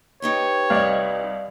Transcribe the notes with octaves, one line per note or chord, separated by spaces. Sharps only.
D#4 G4 B4 C#5
C2 D5 D#5 F5